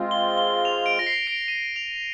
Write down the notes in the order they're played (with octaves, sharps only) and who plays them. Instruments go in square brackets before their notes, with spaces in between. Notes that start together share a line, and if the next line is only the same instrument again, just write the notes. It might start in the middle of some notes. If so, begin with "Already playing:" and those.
Already playing: [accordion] G#3 C4 F4
[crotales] G7
G7
F7
D7
A#6
C7
D7
D#7
F7